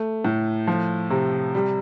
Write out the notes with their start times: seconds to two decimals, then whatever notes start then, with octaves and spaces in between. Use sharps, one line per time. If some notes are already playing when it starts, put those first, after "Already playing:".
Already playing: A3
0.25 A2
0.67 F3
1.10 C3
1.55 G3